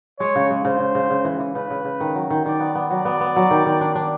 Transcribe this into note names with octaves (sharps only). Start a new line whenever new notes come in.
G#3 C#5
C#3
G#3
C#3 C5
C#3
C#3
C#3
E3
E3
C#3 B4
C#3
C#3
D#3
F#3
D#3
D#3 D5
B3
B3
F#3 D5
B3
B3
F#3
D#3
D#3
D4
D4